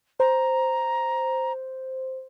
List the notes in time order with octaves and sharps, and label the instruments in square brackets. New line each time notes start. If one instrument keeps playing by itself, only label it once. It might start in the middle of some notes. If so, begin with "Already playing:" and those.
[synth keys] C5 [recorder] A#5